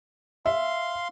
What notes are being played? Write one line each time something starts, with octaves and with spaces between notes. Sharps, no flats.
E5 F5 C6